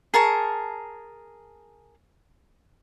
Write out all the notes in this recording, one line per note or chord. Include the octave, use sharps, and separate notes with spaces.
G#4 A#4 A5 C#6